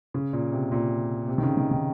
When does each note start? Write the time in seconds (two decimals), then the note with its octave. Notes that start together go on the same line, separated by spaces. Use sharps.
0.14 C#3
0.33 A#2
0.52 C3
0.72 A#2
1.28 C3
1.38 D#3
1.43 C#3
1.57 D#3
1.71 D#3